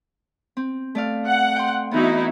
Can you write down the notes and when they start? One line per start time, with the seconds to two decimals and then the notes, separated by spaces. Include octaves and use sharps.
0.57 C4
0.95 A3 D5 F5
1.27 F#5
1.56 G5 C6
1.91 E3 B3 D#4 E4 F#4